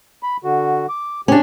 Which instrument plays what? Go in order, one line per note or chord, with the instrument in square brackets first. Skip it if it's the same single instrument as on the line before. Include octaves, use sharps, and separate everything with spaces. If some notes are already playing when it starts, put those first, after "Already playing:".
[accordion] B5
D3 F#4
D6
[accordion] C#3 G4 [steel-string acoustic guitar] C#4 D4